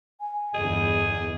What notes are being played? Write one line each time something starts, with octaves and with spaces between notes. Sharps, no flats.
G#5
G1 E2 G#4 D#5